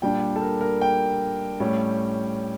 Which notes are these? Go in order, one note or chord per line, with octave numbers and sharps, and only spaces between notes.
A#2 G3 D4 G5
A4
A#4
A#4
G5
A2 G3 C#4